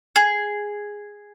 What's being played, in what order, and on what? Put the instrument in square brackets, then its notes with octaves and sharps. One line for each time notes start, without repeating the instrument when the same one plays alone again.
[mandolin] G#4